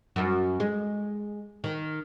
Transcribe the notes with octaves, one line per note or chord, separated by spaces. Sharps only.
F#2
G#3
D#3